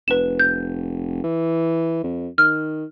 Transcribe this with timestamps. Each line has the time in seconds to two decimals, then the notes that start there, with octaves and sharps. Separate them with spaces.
0.08 F1 B4 E7
0.39 G6
1.24 E3
2.04 F2
2.38 D#3 F6